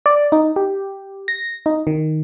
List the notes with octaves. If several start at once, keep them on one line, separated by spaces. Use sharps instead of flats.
D5
D#4
G4
A#6
D#4
D#3